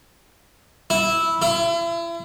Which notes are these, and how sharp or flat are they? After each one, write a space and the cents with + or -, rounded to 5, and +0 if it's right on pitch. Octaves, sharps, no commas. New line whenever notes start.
E4 -10
E4 +40